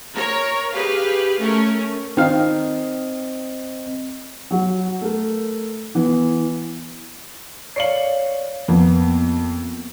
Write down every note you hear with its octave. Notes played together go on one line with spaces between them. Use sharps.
A#4 C#5
G4 G#4 B4 F5
A3 C#4 A#4
D#3 C4 D#5 F5
F#3 F#4
A3 A#4
E3 B3
C#5 D5 F5 C7 C#7 F#7
F2 A#3 B3